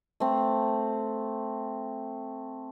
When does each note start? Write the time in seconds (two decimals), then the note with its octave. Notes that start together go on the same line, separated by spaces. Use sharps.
0.20 A3 C4